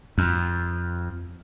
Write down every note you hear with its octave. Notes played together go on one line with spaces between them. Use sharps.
F2